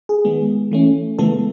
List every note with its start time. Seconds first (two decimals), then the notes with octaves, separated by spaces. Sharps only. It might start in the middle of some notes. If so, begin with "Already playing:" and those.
0.09 G#4
0.25 D#3 G#3 B3
0.71 E3 A3 C#4
1.19 C#3 E3 G#3 A3 B3 A4